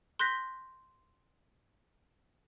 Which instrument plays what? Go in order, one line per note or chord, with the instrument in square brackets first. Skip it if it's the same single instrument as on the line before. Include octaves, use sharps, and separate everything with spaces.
[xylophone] C6 F#6 G6 A#6 B6